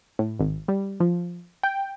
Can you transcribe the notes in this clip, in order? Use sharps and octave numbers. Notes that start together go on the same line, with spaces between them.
A2
G#1
G3
F3
G5